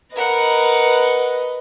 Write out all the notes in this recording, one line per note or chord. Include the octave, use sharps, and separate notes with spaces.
A#4 B4 D#5 F#5